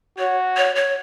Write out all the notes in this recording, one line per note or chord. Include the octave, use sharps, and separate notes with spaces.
F#4 C#5
C#5
C#5